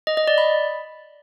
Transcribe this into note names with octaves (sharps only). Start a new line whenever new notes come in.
D#5
D#5
D5
B5